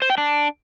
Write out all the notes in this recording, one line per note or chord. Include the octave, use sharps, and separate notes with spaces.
C5
G5
D4